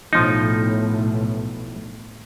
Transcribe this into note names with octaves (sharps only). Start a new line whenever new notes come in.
B1 A2 F3 D#4